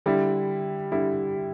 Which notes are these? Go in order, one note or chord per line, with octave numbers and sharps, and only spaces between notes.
D3 G3 E4
D3 G3 E4